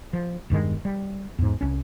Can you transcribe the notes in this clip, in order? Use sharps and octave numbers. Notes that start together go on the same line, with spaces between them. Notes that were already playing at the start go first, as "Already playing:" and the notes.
F3
E1 G2 D#3 G#3
G3
E2 G#2
C2 C#4